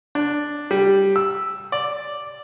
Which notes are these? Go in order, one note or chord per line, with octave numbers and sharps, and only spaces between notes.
D4
G3
E6
D5